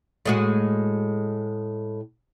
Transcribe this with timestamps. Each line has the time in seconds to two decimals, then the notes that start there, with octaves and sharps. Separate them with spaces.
0.25 A2 G#3 F#4